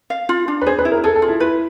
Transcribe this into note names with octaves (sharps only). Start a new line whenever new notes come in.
F5
F4
D4
B4
G#4 C5
B4
E4
A#4
G#4 A4
A4
F4
E4
E4 B4